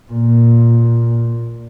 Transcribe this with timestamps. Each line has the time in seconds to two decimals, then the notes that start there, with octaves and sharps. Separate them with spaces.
0.12 A#2